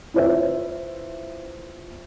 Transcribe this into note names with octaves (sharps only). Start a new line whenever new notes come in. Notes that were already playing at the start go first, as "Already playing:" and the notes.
E4 F4 B4 C5 E5